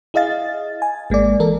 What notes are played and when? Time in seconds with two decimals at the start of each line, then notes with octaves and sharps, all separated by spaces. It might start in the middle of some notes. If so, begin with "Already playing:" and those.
0.14 E4 G#4 D#5 F5 A6
0.82 G#5
1.10 G#1 G#3 A#3 D5
1.40 E3 A4 A#4